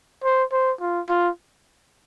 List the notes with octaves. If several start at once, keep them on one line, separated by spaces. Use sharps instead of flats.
C5
C5
F4
F4